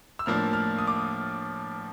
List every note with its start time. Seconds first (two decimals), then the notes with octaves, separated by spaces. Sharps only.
0.19 E6
0.26 A2 F3 A#3 D4 F6
0.53 F6
0.78 D#6
0.87 D6
0.96 D#6